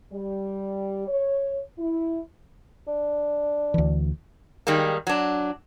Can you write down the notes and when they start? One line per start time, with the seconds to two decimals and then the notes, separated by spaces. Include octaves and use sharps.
0.12 G3
1.08 C#5
1.78 E4
2.87 D4
3.74 D2 E3
4.67 D#3 G3 G#3 A#3
5.07 F#3 D4